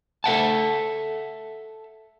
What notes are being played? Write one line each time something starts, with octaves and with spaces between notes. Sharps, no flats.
A4 E5 F#5 A5